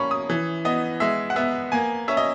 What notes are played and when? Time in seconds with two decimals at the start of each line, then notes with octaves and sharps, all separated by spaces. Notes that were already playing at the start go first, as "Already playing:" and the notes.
Already playing: A#3 C#4 B5 C#6
0.11 D#6
0.30 E3
0.65 B3 D#5
1.00 G#3 E5
1.30 F#5
1.36 B3 E5
1.72 A#3 G#5
2.08 C#4 E5
2.17 D#5